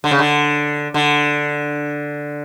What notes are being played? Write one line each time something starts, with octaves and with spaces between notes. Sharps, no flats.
D3
C#3
D3
D3